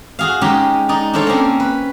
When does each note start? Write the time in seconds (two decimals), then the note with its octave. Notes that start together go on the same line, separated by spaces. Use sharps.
0.19 F#4 G#4 F5
0.41 G#3 C#4 D#4 G4
0.89 D#4 D5
1.14 D4 F4 A4 C5 C#5
1.27 A#3 C4 C#4
1.60 B4